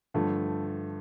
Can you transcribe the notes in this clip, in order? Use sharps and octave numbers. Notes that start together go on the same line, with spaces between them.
G2 D3 F3 A3